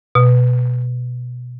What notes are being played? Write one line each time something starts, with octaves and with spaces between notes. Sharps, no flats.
B2